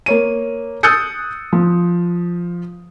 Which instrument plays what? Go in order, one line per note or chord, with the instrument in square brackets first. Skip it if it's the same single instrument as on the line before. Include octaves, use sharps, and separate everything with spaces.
[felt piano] A#3 C#5 D#7
D#6 E6 F#6 G6 A6 C#7
F3